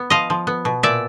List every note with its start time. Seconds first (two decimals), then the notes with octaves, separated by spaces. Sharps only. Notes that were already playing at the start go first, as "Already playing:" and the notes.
Already playing: B3
0.10 F3 D#5 F5
0.30 F3
0.47 B3
0.65 B2
0.83 A#2 D5 E5